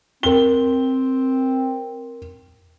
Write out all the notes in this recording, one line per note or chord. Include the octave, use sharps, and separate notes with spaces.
C4 A#4 G7